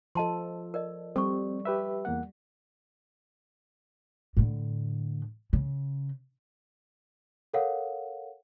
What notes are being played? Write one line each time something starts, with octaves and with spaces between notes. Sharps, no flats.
F3 A4 D#5 A5 C6
A#4 D5 D#5
G3 C4 A4 C#6
G4 B4 E5
E2 A#3 F#5
A2 D3
C#3
A4 A#4 C#5 F5 F#5